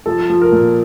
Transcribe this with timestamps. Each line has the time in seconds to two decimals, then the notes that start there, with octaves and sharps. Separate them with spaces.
0.06 F3 A4
0.30 F3
0.42 A#4
0.52 A#2